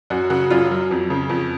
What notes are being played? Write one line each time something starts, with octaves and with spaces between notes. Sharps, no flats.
F#2 F#4
C#3 F#4
F#2 F4
F#3
F2
C#3
F2